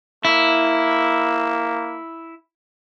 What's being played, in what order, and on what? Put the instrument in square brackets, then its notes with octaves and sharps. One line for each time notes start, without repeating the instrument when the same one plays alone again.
[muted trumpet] A#3 [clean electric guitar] E4